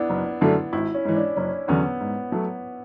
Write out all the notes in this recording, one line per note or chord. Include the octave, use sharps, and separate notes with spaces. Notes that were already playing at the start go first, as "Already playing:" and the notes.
Already playing: B3 D4 E4
F#1
F#2 D3 A3 D4 E4
G#1 E4
C#4
G#2 E3
D4
F#1 C#4
E2 D3 F#3 B3 C#4
G#2
F#3 A3